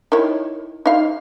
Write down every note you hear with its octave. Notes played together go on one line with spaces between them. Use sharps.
D#3 E4 C#5
D#4 F5